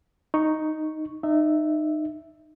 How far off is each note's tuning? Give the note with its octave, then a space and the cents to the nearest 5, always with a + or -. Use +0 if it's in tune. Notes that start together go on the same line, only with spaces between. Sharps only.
D#4 +0 C#6 +0
D#4 -25 E5 +0